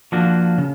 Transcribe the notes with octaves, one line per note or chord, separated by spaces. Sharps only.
F3 A#3 D4 F#4
C#3